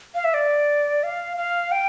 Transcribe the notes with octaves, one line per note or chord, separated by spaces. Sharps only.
F5
E5
D5
F5
F5
G5